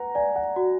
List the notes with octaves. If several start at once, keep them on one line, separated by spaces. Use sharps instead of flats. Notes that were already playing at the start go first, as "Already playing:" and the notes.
Already playing: B4 F#5 A#5
D5 G#5
F#5
F#4